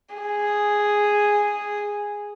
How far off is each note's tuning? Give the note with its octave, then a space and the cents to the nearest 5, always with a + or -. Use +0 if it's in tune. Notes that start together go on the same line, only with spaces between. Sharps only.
G#4 -5